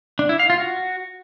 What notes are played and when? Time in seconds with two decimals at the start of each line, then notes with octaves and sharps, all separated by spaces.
0.19 D4
0.29 E4
0.39 F5
0.50 F4
0.60 F#4